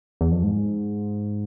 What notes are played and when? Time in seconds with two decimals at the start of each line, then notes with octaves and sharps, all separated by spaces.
0.21 E2
0.31 F2
0.43 G#2